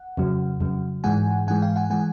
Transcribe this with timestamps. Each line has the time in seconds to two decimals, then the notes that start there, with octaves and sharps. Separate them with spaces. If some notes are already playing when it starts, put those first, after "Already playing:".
Already playing: F#5
0.17 F2 C#3 F#3
0.60 F2 C#3 F#3
1.04 G#2 E3 G#3 F#5 G#5
1.47 G#2 E3 G#3 F#5 G#5
1.62 F5 G5
1.76 F#5 G#5
1.90 E3 G#3 F#5 G#5